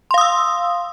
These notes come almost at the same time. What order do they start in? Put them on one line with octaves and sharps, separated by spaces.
C6 F5 D#6 E6